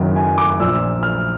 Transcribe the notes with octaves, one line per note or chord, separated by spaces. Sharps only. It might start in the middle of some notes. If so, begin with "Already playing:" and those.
Already playing: F#1 F#2 D#3 F#3
G#5
D6
A#1 A#2 F3 E6
F6